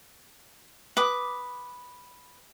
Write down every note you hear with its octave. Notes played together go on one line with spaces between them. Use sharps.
B4 D6 D#6